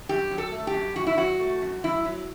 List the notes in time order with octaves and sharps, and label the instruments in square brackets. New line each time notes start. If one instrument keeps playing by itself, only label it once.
[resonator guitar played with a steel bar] F#2 G4
F#3
A4
A3
G4
F#2
F#2 F#4
E4
F#3 F#4
A3
F#2
F#2 E4
F#3